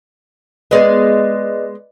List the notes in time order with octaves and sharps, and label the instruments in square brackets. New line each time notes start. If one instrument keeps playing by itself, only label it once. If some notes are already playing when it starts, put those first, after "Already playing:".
[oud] G#3 B3 [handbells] B4 D5 D#5